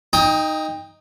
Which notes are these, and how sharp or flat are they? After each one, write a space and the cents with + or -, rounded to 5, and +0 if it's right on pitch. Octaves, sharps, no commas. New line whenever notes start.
D#4 +0 G5 +25 D#6 +25